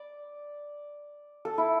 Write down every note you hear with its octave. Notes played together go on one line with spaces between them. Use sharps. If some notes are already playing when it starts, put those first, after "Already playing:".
Already playing: D5
A4
E4